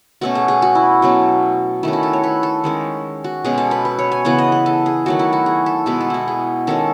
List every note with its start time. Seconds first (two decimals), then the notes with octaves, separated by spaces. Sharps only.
0.21 B2 A3 C#4 F#4
0.35 G#4
0.48 G#4
0.62 F#4
0.75 E4
1.02 B2 F#3 A3 C#4
1.83 D#3 A3 C#4 E4
1.93 F#4
2.03 A4
2.13 C#5
2.24 B4
2.43 A4
2.64 D#3 G#3 C#4
3.24 F#4
3.44 B2 G#3 C#4 G#4
3.58 A4
3.71 B4
3.85 B4
3.99 C#5
4.12 G#5
4.25 C#3 E3 B3 F#5
4.38 D#5
4.52 B4
4.66 A4
4.86 G#4
5.06 D#3 F#3 A3 F#4
5.19 E4
5.33 F#4
5.46 G#4
5.66 A4
5.86 B2 G#3 B3 B4
6.01 A4
6.10 E4 F#4
6.28 G#4
6.67 D#3 G#3 C#4 A4